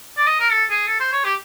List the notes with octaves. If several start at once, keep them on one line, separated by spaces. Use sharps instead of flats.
D5
D#5
A#4
A4
G#4
A4
C5
C#5
G4